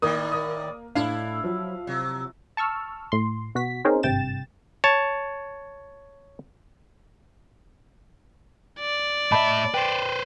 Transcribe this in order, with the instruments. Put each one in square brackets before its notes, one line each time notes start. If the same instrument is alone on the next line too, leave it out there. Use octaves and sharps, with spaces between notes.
[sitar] A2 D#3 [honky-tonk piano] A#3 [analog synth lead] D5 [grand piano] D#6
[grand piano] D#6
[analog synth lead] A2 [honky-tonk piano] D4 [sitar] E4 [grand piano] F5
[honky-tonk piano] F3 [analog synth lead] F#3
[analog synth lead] C3 [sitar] F#3
[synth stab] A5 C#6 E6 F6
A2 C6
B2 F#4 B6
C4 C#4 D#4 G#4 A#4 C5
G#1 G2 C3 G5 A6 E7
[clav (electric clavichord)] C#5 A5
[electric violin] D5
[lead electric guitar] A2 E5 [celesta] D#5 A5 B5
[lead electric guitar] B4 C5 [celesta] G5